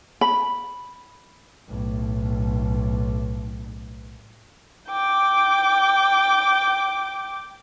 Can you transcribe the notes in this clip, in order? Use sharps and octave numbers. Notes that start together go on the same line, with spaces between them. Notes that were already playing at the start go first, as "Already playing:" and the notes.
B5
B1 A2
G5 D6